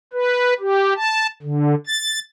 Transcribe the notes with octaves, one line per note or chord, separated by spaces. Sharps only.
B4
G4
A5
D3
A6